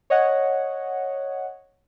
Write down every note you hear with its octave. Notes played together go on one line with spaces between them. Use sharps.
C#5 D#5 F#5